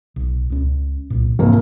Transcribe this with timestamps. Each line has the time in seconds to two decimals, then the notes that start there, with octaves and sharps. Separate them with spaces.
0.16 B1
0.50 C#2 C#4
1.10 C2 A#2
1.39 F1 G#2 A#3